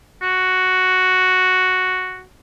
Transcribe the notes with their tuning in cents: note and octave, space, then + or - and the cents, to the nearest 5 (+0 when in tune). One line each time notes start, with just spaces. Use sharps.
F#4 +0